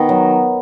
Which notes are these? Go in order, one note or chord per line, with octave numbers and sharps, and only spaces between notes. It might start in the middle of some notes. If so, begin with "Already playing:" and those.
Already playing: D#3 B3
F#3